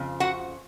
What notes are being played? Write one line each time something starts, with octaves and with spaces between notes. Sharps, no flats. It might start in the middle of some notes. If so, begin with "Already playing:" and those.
Already playing: F2 C#3 F3
F#4 F#5